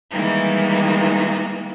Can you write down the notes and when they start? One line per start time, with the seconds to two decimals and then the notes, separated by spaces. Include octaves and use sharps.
0.11 D#3 E3 G3 G#3 A#3 B3